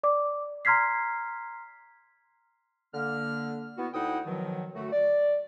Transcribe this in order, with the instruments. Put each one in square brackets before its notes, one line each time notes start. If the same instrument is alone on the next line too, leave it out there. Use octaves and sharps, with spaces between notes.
[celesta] D5 D6
A#5 C6 F6 G#6 B6 C7
[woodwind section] D3 A#3 F6
B3 E4 F#4
D2 D#4 E4 F#5 G5 D#6
B2 D#3 F3 F#3
F#2 D3 A3 F#4
D5